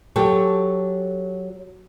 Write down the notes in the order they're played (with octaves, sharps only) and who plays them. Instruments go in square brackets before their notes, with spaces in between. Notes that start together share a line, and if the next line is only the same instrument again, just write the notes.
[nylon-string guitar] F#3 G4 A4 C#5